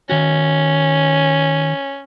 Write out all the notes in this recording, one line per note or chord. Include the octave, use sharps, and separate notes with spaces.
D#3 C#4 F#4